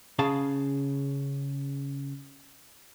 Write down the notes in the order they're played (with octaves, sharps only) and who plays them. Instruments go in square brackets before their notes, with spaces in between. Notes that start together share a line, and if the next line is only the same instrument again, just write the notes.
[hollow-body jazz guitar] C#3 G#4 F5 A5